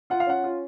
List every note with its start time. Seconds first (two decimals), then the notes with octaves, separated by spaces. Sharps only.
0.10 F4 F#5
0.20 F5
0.26 C#4 F#5
0.44 F4